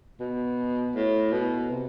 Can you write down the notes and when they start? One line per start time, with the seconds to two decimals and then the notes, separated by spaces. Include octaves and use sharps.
0.20 B2
0.95 A2
1.32 B2
1.70 C3